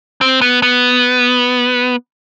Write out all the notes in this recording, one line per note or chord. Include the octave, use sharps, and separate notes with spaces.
C4
B3
B3